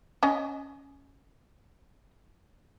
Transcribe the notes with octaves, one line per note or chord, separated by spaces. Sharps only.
C#4 D#5